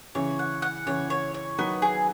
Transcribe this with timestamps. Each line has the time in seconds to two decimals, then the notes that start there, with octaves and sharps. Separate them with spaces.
0.15 C#3 E3 C#5
0.39 F#5
0.62 F#5
0.86 C#3 E3 C#5
1.10 C#5
1.34 C#5
1.58 D#3 F#3 B3
1.82 G#4